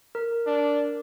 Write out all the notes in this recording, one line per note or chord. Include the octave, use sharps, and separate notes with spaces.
A#4
D4